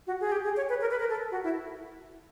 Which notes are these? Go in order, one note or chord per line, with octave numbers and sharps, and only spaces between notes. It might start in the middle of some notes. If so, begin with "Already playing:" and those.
F#4
G#4
G4
G#4
C#5
B4
A#4
B4
A#4
A4
F#4
E4